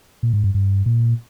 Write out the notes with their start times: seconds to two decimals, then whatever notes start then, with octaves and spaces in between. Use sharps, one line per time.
0.23 A#2
0.33 G#2
0.44 G2
0.54 G2
0.86 A#2